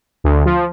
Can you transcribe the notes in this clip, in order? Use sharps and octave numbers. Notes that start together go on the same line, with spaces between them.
D2
F3